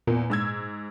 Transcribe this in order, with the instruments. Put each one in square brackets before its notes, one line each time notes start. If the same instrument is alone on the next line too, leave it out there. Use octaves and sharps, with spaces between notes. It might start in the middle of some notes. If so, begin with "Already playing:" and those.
[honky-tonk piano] E2 [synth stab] A#2
[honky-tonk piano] G#2 E6 G#6